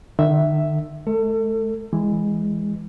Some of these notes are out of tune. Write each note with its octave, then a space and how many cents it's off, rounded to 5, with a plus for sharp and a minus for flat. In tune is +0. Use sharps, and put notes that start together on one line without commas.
D#3 -45 E5 +0
A3 -45 A4 +30
E3 +0 G#3 -10